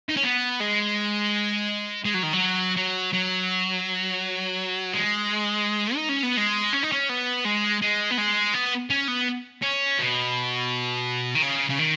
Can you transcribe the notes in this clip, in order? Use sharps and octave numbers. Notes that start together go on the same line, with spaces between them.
D#4
C#4
B3
G#3
G#3
F#3
D#3
F#3
F#3
F#3
G#3
D#4
C#4
B3
G#3
C#4
D#4
C#4
B3
G#3
G#3
B3
G#3
B3
C#4
B3
C#4
B2
D#3
C#3
C#3
D#3